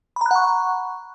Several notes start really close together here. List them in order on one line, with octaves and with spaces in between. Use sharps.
B5 A#5 F#6 F#5 C#6